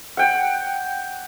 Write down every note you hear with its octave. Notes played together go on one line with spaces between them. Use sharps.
F#5 G5